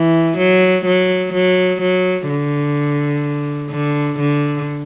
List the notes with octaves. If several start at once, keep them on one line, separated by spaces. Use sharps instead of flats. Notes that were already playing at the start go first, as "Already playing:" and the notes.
Already playing: E3
F#3
F#3
F#3
F#3
D3
D3
D3